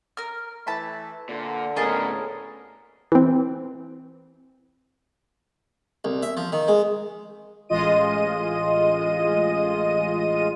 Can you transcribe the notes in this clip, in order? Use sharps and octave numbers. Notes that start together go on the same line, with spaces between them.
A#4 F6
E3 A3 A5 B5
A#2 D3
A2 C#3 B3 G#4 A#4 D#5 A5
E3 C4
C2
E5
F3
D#3
G#3
A1 G#3 F4 D#5 D#7